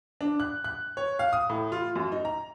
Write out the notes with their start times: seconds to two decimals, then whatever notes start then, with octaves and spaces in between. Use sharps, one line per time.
0.21 D4
0.40 F#6
0.64 F#6
0.97 C#5
1.19 F5
1.33 D#6
1.49 A2
1.72 F4
1.96 F#2
2.12 D#4
2.25 A#5